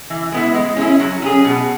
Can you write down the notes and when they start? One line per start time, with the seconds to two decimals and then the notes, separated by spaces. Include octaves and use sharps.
0.10 E3
0.32 G#3 B3 E4
0.54 G#3
0.76 C#4 E4 G#4
1.00 F#3
1.22 C#4 G#4
1.44 B2